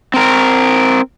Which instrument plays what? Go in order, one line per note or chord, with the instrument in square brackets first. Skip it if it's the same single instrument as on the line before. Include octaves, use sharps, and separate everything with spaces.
[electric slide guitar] C4 A#4